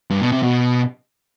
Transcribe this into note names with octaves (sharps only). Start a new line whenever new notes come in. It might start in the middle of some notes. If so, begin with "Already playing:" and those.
G2
B2
C3
B2